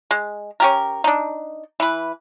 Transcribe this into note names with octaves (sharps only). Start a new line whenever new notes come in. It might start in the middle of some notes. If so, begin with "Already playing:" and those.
G#3
C#4 G4 A#4
D4 D#4
E3 B4